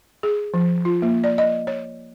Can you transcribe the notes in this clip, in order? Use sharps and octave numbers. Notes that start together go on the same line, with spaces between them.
G#4
F3
F4
A#3
D5
D#5
C#5